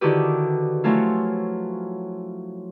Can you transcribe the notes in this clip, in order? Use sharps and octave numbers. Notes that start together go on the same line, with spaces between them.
D3 D#3 E4 F#4 G4 B4
F3 F#3 A3 C#4 E4 F4